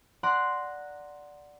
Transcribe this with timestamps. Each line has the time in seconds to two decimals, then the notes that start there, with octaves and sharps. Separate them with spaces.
0.23 D5 F#5 A#5 C6 F#6